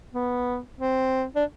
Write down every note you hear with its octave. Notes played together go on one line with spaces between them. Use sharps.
B3
C4
D4